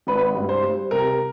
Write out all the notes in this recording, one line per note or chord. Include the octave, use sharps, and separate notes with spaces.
G#1 B4
G2
C5
G3
C3 A#4